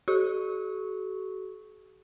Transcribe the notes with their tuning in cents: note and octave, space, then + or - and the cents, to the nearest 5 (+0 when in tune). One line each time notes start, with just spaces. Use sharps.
F#4 +35 A4 -45 C#6 +0